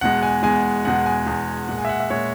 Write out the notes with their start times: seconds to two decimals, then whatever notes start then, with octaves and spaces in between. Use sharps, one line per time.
0.01 E2 B2 G#3 F#5
0.23 G#5
0.43 E2 B2 G#3 G#5
0.85 E2 B2 G#3 F#5
1.06 G#5
1.26 E2 B2 G#3
1.68 A#2 G#3 F#5
1.78 G#5
1.85 E5
1.89 F#5
2.00 E5
2.10 A#2 G#3 C#5